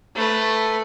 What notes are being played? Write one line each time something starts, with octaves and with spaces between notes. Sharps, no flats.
A3 B4